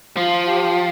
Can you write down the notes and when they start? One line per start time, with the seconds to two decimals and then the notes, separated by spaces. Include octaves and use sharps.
0.17 F3 F4
0.48 G4